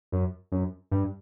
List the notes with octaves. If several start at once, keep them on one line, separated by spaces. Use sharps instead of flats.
F#2
F#2
G2